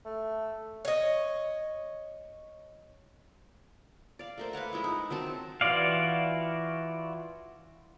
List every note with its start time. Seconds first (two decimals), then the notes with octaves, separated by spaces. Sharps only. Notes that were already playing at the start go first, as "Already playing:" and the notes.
0.05 A3
0.85 C#5 D#5
4.19 D5 F5
4.38 A3 A#4 C5
4.53 B4 C#5 F5 F#5
4.73 F3 G#3 E4
4.84 D#4
5.10 D#3 F#3 C4 A5
5.61 E3 F4 F#4 D5 F5